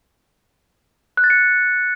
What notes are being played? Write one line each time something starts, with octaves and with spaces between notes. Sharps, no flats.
F#6
A6
C#7